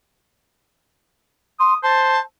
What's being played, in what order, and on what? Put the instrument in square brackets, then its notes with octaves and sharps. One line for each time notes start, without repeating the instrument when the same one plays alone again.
[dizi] C6 [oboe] D#6
[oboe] C5 [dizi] A5